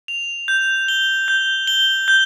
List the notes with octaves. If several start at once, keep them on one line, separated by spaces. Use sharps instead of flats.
F7
G6
G7
G6
G7
G6